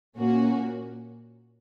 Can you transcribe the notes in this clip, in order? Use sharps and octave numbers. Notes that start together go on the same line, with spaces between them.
A#2 A#3 C#4 F#4